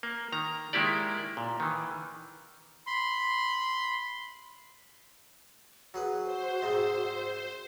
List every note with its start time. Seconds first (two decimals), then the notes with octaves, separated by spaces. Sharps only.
0.03 A#3
0.32 D#3 A#5
0.73 D#3 G#3 A#3 E4 G4 D5
1.37 A#2
1.60 D#3 E3
2.87 B5 C6
5.94 F#3 F#4 G#4 B4
6.24 C5
6.62 C2 G#2 G#3